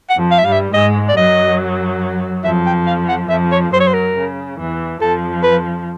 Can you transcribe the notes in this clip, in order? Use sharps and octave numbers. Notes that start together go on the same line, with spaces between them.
F#5
F2 F3
F5
E5
G2 G3 F5
E5
G#2 G#3 D#5
D5
F#2 F#3 D#5
F2 F3 E5
G5
F5
F#5
F2 F3 E5
C#5
F#2 F#3 C5
C#5
C5
A#4
C#3
E2 E3
F2 F3 A4
B4